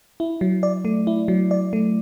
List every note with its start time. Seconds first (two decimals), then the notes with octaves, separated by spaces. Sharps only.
0.20 E4
0.41 F#3
0.63 D5
0.85 A3
1.07 E4
1.28 F#3
1.51 D5
1.73 A3